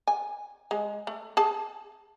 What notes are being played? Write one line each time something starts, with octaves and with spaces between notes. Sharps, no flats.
G#5
G#3
A3
G#4 A5